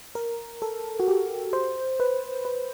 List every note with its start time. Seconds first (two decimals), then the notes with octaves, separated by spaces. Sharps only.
0.15 A#4
0.62 A4
1.00 F#4
1.08 G4
1.53 C5
2.00 B4
2.45 B4